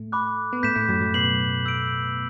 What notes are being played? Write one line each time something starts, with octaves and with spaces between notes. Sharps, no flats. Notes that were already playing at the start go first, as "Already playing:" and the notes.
Already playing: A2 A3
B5 D6 F#6
B3
A2 A3 G6 B6 E7
A2 A3
F#2 F#3
F#2 F#3
B2 B3 F#6 C7 F#7
E6 G6 D7